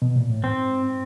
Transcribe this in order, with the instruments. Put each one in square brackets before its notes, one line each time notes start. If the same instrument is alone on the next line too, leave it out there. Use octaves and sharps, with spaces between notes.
[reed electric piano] B2
A#2
A2
[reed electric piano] G#2 [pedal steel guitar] C4